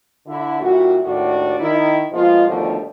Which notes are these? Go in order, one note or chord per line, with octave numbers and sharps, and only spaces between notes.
D3 E4
A#2 G3 E4 F#4
D#2 A2 D4 F#4 D5
D#3 E4
B2 F3 G#3 A#3 F4
D#2 B2 D3 F3 G3 A3